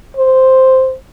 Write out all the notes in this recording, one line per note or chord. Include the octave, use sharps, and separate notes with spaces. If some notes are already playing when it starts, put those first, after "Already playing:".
C5